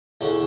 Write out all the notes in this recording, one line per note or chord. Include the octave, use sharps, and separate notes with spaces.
E2 D3 C#4